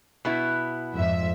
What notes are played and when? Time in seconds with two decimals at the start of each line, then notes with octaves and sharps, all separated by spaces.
0.25 B2 B3 E4
0.95 F2 G#2 E5